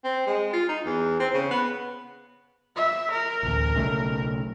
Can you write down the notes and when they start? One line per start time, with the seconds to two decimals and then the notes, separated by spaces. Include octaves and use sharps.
0.04 C4
0.27 G#3
0.53 F4
0.69 D#4
0.86 E2
1.20 C4
1.34 C#3
1.51 B3
2.76 E5
3.11 A#4
3.43 A1 D2
3.75 B1 C#3 A3